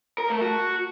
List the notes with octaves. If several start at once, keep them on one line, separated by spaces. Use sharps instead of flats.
A#4
A3
F#4